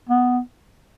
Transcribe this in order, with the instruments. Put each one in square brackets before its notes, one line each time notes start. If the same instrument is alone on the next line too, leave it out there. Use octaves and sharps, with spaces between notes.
[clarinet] B3